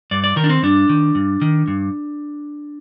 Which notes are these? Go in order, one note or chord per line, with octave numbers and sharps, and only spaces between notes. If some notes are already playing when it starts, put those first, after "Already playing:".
G2 D5
D5
D#3 A#4
D4
C4
G2 D4
D#3
G2
D#3
G2